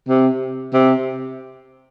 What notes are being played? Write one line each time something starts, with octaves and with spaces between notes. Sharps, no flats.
C3
C3